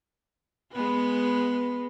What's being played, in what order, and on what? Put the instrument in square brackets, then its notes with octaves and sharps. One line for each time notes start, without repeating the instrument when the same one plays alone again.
[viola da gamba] G#3 B3 B4